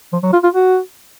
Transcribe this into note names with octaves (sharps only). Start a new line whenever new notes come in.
F3
F#3
F4
F4
F#4